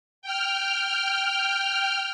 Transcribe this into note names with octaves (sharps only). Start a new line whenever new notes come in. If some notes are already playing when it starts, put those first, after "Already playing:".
G5 F6